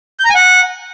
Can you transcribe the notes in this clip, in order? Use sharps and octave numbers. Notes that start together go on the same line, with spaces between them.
G6
A#5
G#5
F#5